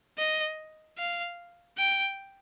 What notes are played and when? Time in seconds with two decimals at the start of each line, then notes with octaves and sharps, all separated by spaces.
0.18 D#5
0.98 F5
1.78 G5